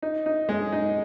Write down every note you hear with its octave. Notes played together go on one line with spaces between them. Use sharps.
D#4
D#4
G#3
D#4